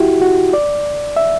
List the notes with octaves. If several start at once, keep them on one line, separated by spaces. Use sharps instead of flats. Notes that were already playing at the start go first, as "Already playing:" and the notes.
Already playing: E4 F#4 G4
F#4
D5
E5